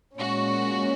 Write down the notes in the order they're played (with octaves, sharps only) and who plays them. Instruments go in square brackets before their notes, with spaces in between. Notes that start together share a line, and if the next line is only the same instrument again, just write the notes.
[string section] A#2 G#3 C#4 [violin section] F#4